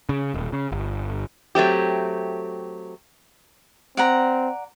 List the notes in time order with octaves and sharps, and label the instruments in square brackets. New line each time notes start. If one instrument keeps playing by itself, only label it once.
[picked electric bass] C#3
D#1
C#3
G1
[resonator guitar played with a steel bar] F#3 A3 C4 G4
[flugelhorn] C4 [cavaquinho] D5 F#5 A#5